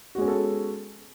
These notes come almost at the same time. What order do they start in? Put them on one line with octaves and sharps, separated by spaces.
F#4 G#3 C#4 B3 A4